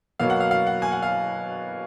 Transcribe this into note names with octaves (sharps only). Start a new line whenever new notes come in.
B2 F#3 A#3 F5
F#5
F5
F5
F#5
G#5
F#5
F5